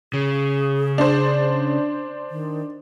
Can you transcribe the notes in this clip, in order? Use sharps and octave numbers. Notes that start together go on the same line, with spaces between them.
C#3 G#4
D4 C5
D#3